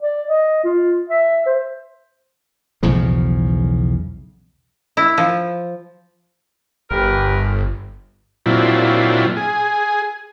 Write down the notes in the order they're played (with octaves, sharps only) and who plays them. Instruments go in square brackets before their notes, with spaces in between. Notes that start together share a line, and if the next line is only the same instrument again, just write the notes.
[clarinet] D5
D#5
F4
E5
C5
[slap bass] B1 E2 C#3 F3
[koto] E4
F3
[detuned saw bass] G1 [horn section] G4 A#4 B4
[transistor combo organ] A#2 F#3 C4 D4 E4 F4
G#4